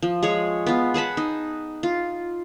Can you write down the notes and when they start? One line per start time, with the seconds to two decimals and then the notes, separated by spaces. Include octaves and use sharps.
0.02 F3
0.23 G#3 G#4 C#5
0.66 B3 F4
0.94 G#4 F#5 A5 B5
1.17 D#4
1.83 F4